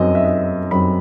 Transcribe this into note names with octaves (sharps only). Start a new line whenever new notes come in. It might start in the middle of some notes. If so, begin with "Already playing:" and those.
Already playing: F#2 F#3 C4 D#5
E5
D#5
F#2 F#3 C4 B5